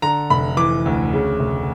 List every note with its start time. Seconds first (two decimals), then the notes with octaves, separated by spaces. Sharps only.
0.02 D3 A#5
0.30 F1 B5
0.57 E3 D6
0.86 D2
1.13 C#3
1.39 F1